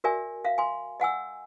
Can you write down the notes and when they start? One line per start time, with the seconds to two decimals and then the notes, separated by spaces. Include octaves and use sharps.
0.04 F#4 A#4 D5 E5 G#5
0.44 E5 F5
0.58 G#5 C6
1.00 D#5 F#5 G#5 E6